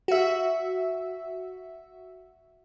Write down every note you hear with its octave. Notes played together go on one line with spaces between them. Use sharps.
F#4 E5